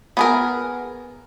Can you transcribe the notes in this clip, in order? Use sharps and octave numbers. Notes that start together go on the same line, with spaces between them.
B3 G#4 A#4